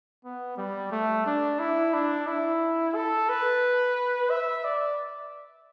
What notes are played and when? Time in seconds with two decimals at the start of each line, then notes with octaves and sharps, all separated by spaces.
0.25 B3
0.58 G3
0.92 A3
1.26 D4
1.59 E4
1.94 D4
2.27 E4
2.95 A4
3.29 B4
4.31 E5
4.64 D5